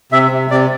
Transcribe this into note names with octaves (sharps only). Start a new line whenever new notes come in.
C3 E5
C3
C3 D5